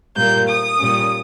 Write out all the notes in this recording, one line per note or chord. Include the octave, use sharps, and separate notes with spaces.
A#2 G3 A#3 G6
D#6
A#2 G3 C#4